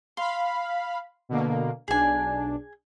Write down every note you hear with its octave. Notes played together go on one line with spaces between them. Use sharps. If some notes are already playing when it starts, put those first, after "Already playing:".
F5 B5 C6
B2 D3 A#3
B1 D4 G#4 G#5